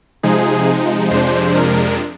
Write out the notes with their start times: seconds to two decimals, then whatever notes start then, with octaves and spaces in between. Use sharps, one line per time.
0.23 C3 F3 G#3 D#4 G#4
1.11 F2 C3 F3 G#3 D4 C5
1.55 A#4